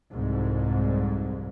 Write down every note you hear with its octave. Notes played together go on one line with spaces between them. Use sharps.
C2 F2 G#2